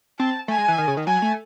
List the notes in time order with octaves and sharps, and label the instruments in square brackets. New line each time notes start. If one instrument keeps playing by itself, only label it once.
[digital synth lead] C4 [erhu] A5
[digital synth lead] A3 [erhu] G#5
[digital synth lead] G#3
E3
D#3
C#3
D#3
[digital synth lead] F#3 [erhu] G#5
[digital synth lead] A3